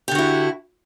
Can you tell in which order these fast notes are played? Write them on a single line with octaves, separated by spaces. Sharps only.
G4 D3 F#4 E4